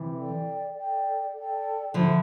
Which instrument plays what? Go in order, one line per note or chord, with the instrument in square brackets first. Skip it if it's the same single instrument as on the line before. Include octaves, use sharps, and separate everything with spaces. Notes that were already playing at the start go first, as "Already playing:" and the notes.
Already playing: [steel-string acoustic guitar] C3 E3
[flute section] A4 D5 G5
A4 D5 G5
A4 D5 G5
[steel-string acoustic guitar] D3 F3 [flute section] A4 E5 B5